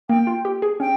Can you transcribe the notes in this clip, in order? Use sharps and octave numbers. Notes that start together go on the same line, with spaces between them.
A#3 G5
F4
G4
G#4
C#4 G5